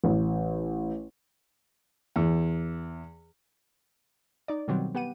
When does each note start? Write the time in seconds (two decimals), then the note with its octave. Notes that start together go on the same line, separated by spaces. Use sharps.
0.04 A1
2.16 E2
4.48 D#4 D5
4.68 B2 D#3 F#3 G3 C4
4.95 B3 G4 F#5 D#7